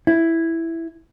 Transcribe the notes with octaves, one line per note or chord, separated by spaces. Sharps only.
E4